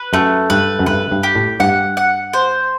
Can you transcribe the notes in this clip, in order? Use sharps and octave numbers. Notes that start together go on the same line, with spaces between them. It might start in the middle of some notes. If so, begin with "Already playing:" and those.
Already playing: B4
F#2 A3
G2 B4
F#2
G2 B4
G2
G4
A2
G2 F#5
F#5
C5